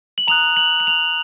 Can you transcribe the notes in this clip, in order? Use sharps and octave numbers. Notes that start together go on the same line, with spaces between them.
F#7
A#5 D#6 F#6 F7
F#7
F#7
F7